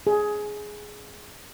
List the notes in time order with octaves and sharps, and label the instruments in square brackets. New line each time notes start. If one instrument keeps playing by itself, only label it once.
[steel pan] G#4